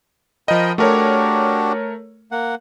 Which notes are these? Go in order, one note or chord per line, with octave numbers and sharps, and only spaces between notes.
F3 A#4 D#5 G5 B5
A3 D4 F#4 G4 A#4 C#5
A#3 F#5